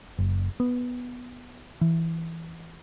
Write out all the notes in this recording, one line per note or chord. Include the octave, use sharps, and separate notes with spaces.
F#1
B3
E3